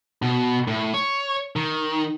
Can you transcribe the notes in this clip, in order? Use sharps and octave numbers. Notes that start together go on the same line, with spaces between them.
B2
A2
C#5
D#3